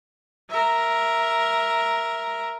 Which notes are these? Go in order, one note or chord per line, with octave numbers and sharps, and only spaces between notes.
A#4 E5